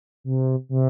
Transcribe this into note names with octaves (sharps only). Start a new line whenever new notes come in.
C3
C3